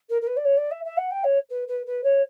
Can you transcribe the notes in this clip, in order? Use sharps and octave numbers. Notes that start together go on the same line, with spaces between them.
A#4
A#4
B4
D5
C#5
D5
E5
E5
F#5
G5
C#5
B4
B4
B4
C#5